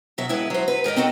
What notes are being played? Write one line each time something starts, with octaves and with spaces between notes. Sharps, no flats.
B2 F#3 E5
F2 G#3 E4 B4 E5
F#3 C5
B4
G#2 A#4 D5 D#5
C4 D#4 F#4 A4